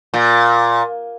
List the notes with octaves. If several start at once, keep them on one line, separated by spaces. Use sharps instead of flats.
A#2